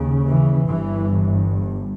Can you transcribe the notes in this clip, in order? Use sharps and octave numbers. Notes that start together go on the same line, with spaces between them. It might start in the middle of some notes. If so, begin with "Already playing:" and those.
Already playing: D#2 C#3
E3
G1 G2 E3